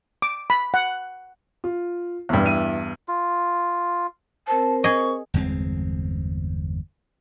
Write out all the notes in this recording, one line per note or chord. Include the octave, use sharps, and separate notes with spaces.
D6
B5
F#5
F4
E2 G2
E4 E5 D#7
F4
C4 A#4 C5 A5
G#4 D#5 C#6
G1 E2 G#3 C4